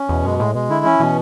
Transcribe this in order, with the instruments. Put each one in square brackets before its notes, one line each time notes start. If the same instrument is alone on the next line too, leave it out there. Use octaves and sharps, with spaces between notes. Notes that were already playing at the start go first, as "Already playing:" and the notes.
Already playing: [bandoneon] C#4
[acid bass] E2 [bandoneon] B2
[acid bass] F#2 [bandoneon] G#3
[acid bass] A2 [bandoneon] G#3
[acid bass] B2 [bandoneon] G#3
[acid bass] D3 [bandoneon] E4
[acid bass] E3 [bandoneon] C#4
[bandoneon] B2 [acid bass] E3